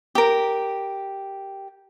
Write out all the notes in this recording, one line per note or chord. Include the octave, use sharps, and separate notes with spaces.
G4 A#4